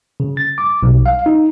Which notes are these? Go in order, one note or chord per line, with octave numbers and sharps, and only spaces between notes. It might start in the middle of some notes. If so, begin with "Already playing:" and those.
C#3
A6
D6
B1
F5
D#4